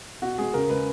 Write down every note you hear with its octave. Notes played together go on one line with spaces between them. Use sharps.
B2 F#4
G#3 B3 G#4
C#3 A#4
G#3 C#4 B4